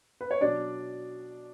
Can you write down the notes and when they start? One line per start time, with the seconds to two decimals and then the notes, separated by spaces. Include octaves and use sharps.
0.21 B4
0.31 C#5
0.41 B2 F#3 D4 D5